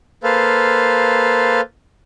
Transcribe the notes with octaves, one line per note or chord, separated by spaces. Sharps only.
A#3 A4 B4 C5 F5